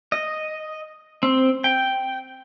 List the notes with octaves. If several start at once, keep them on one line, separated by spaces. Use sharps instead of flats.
D#5
C4
G5